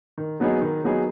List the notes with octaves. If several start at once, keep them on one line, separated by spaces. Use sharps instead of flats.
D#3
F#3 B3 D#4 G#4
D#3
F#3 B3 D#4 G#4